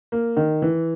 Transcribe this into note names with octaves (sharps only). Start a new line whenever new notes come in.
A#3
D#3
E3